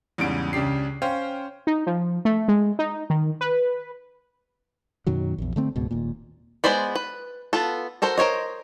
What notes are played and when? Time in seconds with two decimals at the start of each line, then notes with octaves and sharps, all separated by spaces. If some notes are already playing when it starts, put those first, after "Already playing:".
0.18 E2 G#2 C#3 G3 D7
0.53 C#2 C#3 D4 G4 C7
1.02 C#4 C5 C#5 F5 G5
1.67 D#4
1.87 F3
2.25 A3
2.48 G#3
2.79 D#4
3.10 D#3
3.41 B4
5.07 F#2 B2 D#3 F#3
5.38 A#1 E2
5.56 D3 A3 C4
5.76 C#2 G#2 B2
5.91 D#1 D#2 A#2
6.64 G#3 B3 C5 D5 B5
6.95 B4
7.53 B3 F4 A4
8.02 F#4 A4 A#4 C5
8.18 A#4 C5 C#5 D#5